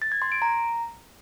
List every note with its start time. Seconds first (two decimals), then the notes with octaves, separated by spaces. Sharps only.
0.02 A6
0.12 G#6
0.22 C6
0.32 D7
0.42 A#5